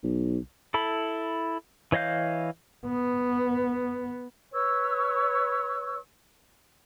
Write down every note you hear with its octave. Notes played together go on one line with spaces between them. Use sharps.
B1
E4 A4 B5
E3 C#5 D#5 F5 G6
B3
B4 C#5 C#6 E6